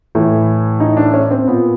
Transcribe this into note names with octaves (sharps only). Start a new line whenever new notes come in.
A2 E3
D#4
D4
C#4
C4
A#2 B3